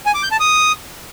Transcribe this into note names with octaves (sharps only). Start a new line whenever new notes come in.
G#5
D6
G6
A5
D#6